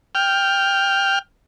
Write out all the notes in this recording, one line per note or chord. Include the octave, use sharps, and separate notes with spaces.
G5 F6